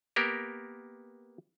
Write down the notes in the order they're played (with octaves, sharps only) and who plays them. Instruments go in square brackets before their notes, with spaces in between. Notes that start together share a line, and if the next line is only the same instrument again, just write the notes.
[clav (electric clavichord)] A#3 B3 G4 A#4